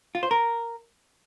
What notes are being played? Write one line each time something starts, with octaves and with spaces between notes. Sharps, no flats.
F4
C5
A#4